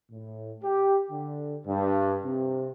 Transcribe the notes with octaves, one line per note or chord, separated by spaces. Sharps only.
A2
G4
D3
G2
C3